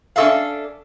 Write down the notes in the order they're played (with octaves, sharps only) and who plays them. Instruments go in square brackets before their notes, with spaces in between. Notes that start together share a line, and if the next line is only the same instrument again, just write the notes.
[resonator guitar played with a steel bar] C#4 D4 F#4 A4 E5 F5